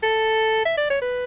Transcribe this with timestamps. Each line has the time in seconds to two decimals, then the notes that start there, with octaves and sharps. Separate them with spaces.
0.03 A4
0.66 E5
0.78 D5
0.90 C#5
1.02 B4